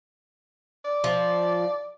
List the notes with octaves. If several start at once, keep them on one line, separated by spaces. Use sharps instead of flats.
D5
F3